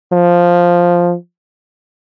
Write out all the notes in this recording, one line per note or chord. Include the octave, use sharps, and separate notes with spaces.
F3